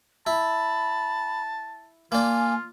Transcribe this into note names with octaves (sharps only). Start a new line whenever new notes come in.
E4 A5 B5
A#3 D4 F4 G#5